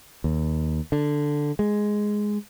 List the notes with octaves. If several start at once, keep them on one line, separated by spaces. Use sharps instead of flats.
D#2
D3
G#3